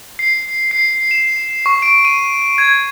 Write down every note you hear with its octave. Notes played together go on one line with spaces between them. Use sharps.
C7
C7
E7
C#6
D7
D#7
G#6